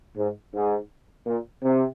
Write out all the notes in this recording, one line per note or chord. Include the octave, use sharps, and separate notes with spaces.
G#2
G#2
A#2
C3